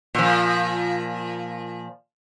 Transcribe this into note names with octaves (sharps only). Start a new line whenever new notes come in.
A#2 F3